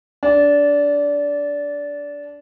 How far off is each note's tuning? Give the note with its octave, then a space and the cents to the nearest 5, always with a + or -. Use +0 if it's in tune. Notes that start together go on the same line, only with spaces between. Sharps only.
D4 -20